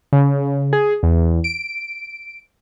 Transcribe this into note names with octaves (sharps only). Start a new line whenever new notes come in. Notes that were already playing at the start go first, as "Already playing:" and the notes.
C#3
G#4
E2
D7